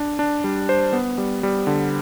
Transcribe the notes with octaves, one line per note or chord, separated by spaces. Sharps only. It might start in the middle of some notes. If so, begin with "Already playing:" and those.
Already playing: D4
D4
G3
C5
B3
G3
G3
D3